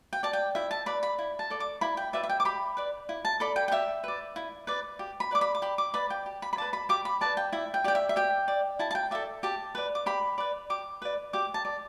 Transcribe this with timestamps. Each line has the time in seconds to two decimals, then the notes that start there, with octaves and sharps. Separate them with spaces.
0.13 G5
0.23 D5 A5
0.33 G5
0.55 E4 E5
0.71 A5
0.86 B4 D5 B5
1.03 B5
1.19 E4
1.39 A5
1.50 A4 D5
1.60 D6
1.81 E4 B5
1.97 G5
2.13 B4 D5 E5
2.23 E5
2.29 G5
2.40 D6
2.45 G4 B5
2.77 B4 D5
3.09 E4
3.25 A5
3.40 A4 D5 B5
3.56 G5
3.68 G5
3.72 G4 E5
4.04 B4 D5
4.36 E4
4.67 B4 D5
4.99 G4
5.20 B5
5.31 B4 D5 D6
5.41 B5
5.55 D6
5.62 G4 B5
5.78 D6
5.94 B4 D5 B5
6.10 G5
6.26 G4
6.42 B5
6.53 B5
6.57 B4 D5 A5
6.73 B5
6.89 G4 D6
7.05 B5
7.21 B4 D5 A5
7.37 G5
7.53 E4 E5
7.74 G5
7.84 G4 D5 G5
7.95 E5
8.09 E5
8.16 G4 G5
8.48 D5
8.79 E4 A5
8.91 A5
8.95 G5
9.11 A4 D5 E5
9.43 G4 A5
9.75 B4 D5
9.95 D6
10.06 G4 B5
10.38 B4 D5
10.70 G4 D6
11.02 B4 D5
11.33 G4 D6
11.54 A5
11.65 D5